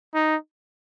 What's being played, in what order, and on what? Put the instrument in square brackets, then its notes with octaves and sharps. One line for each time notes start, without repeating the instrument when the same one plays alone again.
[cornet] D#4